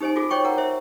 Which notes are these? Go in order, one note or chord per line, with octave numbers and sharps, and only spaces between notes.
D#4 G4 C5 D#5 G#5
F4 F#4 G#4
C5 C#5 D#5 G5 C#6
A#4 F#5 A#5
C5 E5